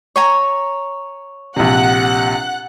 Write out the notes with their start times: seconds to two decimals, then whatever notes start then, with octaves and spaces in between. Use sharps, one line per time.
0.16 C#5 G#5 A#5
1.56 A#1 C3 F#5 F#6